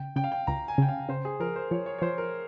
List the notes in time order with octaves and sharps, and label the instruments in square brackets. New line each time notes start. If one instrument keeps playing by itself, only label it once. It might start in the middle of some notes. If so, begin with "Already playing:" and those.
Already playing: [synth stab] C#3 [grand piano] G5
[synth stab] C#3 [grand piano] G5
[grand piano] F5
G5
[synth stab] C#2 [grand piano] A#5
[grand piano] G#5
[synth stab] C#3 [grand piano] G5
[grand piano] F5
[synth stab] C#3 [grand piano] C5
[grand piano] G#4
[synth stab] F3 [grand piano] A#4
[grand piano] C5
[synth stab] F3 [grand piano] C#5
[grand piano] C#5
C#5
[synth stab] F3 [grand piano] C5
[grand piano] A#4